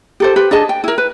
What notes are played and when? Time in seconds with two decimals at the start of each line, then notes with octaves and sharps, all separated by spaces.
0.20 G4 A4 C5
0.36 G4 B4 C5
0.51 D4 G#4 D#5 A5
0.69 G5
0.84 E4 A#4
0.98 B4